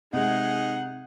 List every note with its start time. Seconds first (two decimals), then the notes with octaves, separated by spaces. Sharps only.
0.13 C3 G#3 D#4 G#4 F#5